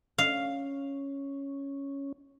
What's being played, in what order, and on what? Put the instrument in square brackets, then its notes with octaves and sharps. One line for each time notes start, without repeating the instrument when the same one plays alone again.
[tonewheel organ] C#4 [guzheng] F5